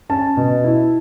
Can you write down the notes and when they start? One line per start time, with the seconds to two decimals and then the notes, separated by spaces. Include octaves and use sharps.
0.09 C#4 A5
0.37 B2
0.64 E4